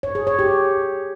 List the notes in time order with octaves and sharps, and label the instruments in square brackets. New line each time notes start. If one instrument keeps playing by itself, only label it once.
[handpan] C#5
G#4
C#5
G4